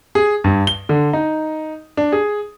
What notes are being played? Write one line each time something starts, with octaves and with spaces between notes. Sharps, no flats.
G#4
G2
G7
D3
D#4
D4
G#4